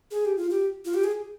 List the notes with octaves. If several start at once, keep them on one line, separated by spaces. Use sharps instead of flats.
G#4
G4
F4
G4
F4
G4
G#4